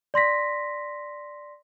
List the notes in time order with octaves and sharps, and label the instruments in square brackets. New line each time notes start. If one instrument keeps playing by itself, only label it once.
[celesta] D5 C6 A#6 B6